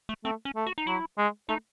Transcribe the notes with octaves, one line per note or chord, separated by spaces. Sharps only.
A3
A3 C4
C#4
A3
F#4
D#4
F#3 E4
G#3
A3 D#4